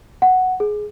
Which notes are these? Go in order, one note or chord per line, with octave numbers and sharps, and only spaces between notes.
F#5
G#4